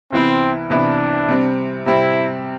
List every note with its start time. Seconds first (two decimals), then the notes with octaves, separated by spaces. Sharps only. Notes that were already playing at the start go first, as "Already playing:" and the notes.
0.12 C2 C3 E3 B3 C4 E4
0.70 C2 C3 E3 B3 D4 E4
1.29 C3 G3 C4
1.86 C3 G3 C4 E4